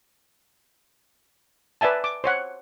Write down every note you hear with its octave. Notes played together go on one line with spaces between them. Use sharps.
B4 D5 E5 G#5 A5
D6
C5 C#5 F#5